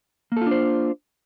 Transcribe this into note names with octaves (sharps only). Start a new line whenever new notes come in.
A#3 D4 F4 A4 C5